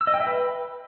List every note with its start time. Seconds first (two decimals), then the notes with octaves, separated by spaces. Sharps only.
0.01 E6
0.07 D#5
0.14 G5
0.20 E5
0.27 B4